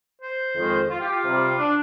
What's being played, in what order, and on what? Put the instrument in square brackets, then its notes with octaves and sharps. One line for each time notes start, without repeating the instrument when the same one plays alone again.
[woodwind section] C5
F2 D#3 G#3
F4
G4
F4
C3 G3
D4